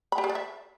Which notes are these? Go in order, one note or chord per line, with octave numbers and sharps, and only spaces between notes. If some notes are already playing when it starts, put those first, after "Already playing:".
B5
G4
G#4
D5
E5